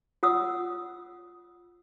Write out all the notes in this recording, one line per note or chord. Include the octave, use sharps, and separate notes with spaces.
F4 F#5 D#6 E6